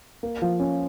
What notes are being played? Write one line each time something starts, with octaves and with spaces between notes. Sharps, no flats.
A#3
F3
C#4